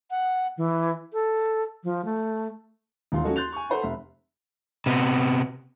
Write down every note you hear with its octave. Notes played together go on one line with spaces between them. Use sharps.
F#5
E3
A4
F3
A3
D#1 D#2 E3 F4 C6
F3 C#4 F#4 A4 D#5
C6 F#6 G6 A6 F7
G#5 C#6
A4 B4 C5 F#5 C6
F1 E5 B5
C3 B3